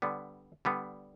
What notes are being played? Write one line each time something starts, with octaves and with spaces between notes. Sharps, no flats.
D3 G3 B3
D3 G3 B3